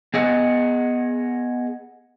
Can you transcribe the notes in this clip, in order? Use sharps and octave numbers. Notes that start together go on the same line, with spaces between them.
B3 G#4 D#5 F#5